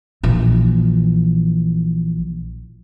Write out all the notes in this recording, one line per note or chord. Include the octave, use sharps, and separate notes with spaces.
A#1 E3